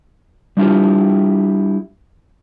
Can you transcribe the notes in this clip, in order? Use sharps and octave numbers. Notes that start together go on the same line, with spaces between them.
G3 D4 E4 F4 G4